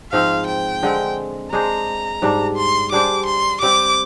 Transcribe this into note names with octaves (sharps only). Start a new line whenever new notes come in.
G#2 F3 C4 F5
G5
D3 G#3 C4
G#3 D4 G#4 C5 A#5
G#2 G3 D4
C6
G3 D4 G#4 C5 D6
C6
G3 C4 G4 D6